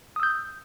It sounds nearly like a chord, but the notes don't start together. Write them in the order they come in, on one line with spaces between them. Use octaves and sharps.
D#6 E6 G6